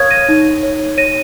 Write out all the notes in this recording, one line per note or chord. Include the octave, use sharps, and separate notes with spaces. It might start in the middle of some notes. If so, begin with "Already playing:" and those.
Already playing: A#4 C#5 F5 C#6 D#6 F6 G#6
A#6 D#7
D#4
C#5
C#5 A#6 D#7